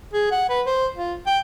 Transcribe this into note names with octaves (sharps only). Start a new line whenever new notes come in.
G#4
F#5
B4
C5
F4
G5